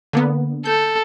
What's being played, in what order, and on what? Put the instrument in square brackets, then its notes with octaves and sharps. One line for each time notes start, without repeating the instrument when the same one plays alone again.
[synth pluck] D3 A#3 B3
[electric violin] A4 [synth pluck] G6